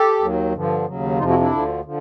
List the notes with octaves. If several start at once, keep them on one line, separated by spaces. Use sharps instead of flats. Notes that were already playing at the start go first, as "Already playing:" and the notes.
Already playing: G4 A4
D#2 D#3 F#3
G2 D3 F3
D#2 C#3 F#3
F2 C3 F3 D#4 F4
E4 F#4
D4 E4
D2 D3 F3
D3 F3